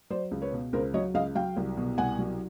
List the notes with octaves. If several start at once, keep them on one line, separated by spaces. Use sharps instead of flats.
F#3 C5 D5
C#2
B4 C#5
B2
C#2 A#4 C5
F#3 C#5 D#5
C#2 D#5 F5
F#3 F5 G5
C2
B2
C2 F#5 G#5
F#3